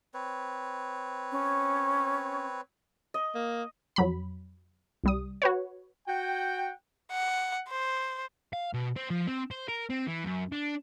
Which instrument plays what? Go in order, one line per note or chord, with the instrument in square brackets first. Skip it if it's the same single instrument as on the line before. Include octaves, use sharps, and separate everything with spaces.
[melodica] C4 B4 C#5
[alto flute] C#4
[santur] D#5
[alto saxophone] A#3
[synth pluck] F2 F#3 B5
C2 G3 D#6
F#4 B4 C#5
[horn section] F#4 F#5 G5
[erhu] F#5
C5
[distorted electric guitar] F5
B2
C4
F3
C4
C5
A#4
C4
E3
F#2
D4